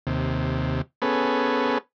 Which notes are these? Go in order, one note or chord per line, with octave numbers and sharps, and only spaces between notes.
D#2 C3
B3 C#4 G#4 A4 B4